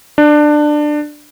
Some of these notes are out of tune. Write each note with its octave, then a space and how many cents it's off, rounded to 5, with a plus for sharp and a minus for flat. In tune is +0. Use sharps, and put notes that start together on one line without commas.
D4 +20